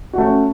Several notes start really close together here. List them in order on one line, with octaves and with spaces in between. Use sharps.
F#4 A3 C#4